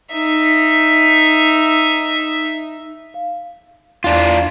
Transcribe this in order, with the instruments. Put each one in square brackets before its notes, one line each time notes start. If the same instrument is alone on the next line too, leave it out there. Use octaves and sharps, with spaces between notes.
[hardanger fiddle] D#4 E5
[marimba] F5
[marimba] E2 [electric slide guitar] D4 F4